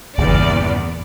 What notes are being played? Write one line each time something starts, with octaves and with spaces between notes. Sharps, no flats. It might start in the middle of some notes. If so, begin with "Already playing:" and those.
G1 E2 A#2 C#3 D5